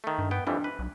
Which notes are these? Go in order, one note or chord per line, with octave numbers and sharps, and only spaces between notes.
D#3 A3
G2
B3 G5
F2 E3 G3 D4
B4
B1